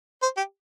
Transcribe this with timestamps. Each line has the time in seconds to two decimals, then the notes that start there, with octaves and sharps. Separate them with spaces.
0.23 C5
0.37 G4